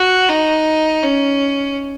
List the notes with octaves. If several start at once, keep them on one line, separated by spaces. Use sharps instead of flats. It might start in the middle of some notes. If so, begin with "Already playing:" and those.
Already playing: F#4
D#4
C#4